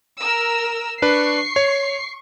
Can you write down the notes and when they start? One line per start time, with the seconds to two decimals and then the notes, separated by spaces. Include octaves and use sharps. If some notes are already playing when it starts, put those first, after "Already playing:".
0.21 A#4 E6
1.02 D4 B4 C#6 C7
1.56 C#5